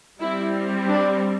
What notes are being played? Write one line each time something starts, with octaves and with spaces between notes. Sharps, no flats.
G3 C4 E4
D4